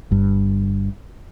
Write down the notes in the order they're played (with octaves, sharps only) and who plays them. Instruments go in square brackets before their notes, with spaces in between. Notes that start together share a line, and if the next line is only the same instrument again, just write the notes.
[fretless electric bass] G1 G2